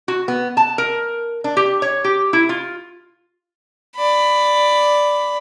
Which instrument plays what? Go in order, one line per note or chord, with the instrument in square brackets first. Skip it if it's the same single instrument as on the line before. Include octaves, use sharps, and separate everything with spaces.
[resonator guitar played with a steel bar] F#4
B3
A5
A#4
D4
G4
C#5
G4
E4
F4
[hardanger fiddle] D5 B5